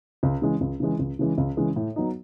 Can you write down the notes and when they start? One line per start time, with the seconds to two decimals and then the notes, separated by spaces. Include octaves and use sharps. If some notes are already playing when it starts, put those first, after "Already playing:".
0.23 C#2
0.42 C#3 E3 G#3
0.61 C#2
0.80 C#3 E3 G#3
0.99 C#2
1.19 C#3 E3 G#3
1.38 C#2
1.57 C#3 E3 G#3
1.76 A2
1.96 F#3 B3 D#4